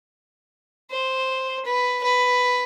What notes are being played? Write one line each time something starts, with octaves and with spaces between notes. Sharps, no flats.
C5
B4
B4